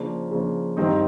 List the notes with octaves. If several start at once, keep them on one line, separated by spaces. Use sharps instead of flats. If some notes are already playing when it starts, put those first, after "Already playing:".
Already playing: C#3 F3 A#3 D4
C#3 F3 A#3 D4
G2 D#3 G3 C4 D#4